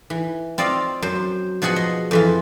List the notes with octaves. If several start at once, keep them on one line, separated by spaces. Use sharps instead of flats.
E3
C4 F4 D5 D#5 F5
F#2 C5
B2 F3 F#4 G#4 F#5 G#5
D#5
F2 E3 F4